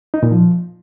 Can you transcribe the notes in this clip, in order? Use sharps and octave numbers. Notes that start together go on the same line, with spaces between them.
D#4
A#2
F3